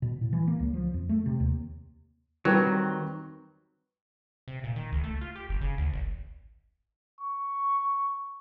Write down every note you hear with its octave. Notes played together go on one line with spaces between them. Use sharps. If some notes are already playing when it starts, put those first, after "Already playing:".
B2
A2
E3
A#3
C#2
F3
F2
A3
C3
D#2
D#3 F#3 G3 C4 B4
C3
A#2
D#3
C#2
A3
F4
G4
G1
C#3
D2
G#1
C#6